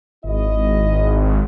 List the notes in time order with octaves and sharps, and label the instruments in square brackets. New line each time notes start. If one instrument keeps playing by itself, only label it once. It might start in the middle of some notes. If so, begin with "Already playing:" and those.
[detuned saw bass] G#1 [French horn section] E4 D#5